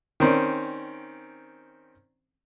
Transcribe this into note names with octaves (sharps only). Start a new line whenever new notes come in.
D#3 C4 C#4 D5